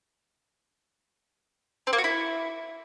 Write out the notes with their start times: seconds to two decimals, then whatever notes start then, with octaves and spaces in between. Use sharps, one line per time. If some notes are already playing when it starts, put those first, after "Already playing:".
1.87 C4
1.93 A#3
1.98 F#4
2.04 E4